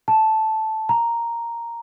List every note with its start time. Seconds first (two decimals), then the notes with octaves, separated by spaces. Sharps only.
0.08 A5
0.89 A#5